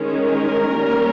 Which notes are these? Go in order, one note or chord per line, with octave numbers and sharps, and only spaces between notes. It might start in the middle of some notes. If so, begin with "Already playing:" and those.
Already playing: D#3 G#3 C#4
A#4
G3 A#3 C#4